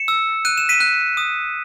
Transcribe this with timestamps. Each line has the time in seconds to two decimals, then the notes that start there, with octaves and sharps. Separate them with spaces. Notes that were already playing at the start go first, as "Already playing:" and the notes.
Already playing: C#7 E7
0.08 E6
0.45 F#6 D#7
0.58 E7
0.69 B6 D#7
0.80 F#6
1.17 D#6